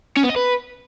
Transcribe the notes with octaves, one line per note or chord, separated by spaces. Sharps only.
C#4
B3
D#5
B4